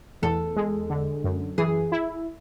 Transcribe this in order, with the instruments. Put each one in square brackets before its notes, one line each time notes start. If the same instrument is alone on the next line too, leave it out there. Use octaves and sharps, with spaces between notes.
[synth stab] E2 [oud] A4
[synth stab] G#3
D3
F#2
[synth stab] E3 [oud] G#4
[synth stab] E4